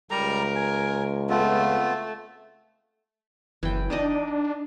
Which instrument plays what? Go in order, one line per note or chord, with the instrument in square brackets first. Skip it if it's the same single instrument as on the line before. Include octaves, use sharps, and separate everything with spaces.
[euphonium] C#2 [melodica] G3 A#5 [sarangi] A#4
[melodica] G#5
[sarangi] A3 [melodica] B3 C4 F4
[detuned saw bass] F#1 [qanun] E3 G5
[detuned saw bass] D4 [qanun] D#4 D5 D#5